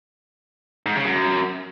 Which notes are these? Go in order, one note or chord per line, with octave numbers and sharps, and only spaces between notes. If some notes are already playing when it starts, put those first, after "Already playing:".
G#2
C#3
F#2